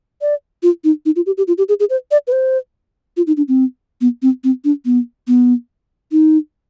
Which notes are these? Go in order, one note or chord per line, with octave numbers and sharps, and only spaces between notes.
D5
F4
D#4
D#4
F4
G4
G4
F4
G4
G#4
G#4
C5
D5
B4
C5
F4
D#4
D4
C4
B3
C4
C4
D4
B3
B3
D#4